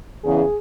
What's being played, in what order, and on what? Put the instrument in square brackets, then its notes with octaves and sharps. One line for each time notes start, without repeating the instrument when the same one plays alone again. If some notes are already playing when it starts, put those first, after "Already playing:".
[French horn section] E2 C#3 E3 G#4